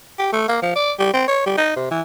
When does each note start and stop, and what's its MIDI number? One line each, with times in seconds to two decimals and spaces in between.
0.19 0.29 67
0.33 0.46 57
0.49 0.60 58
0.62 0.73 53
0.76 0.92 74
0.99 1.13 55
1.14 1.23 60
1.28 1.43 73
1.46 1.55 55
1.58 1.72 63
1.76 1.89 48
1.91 2.01 52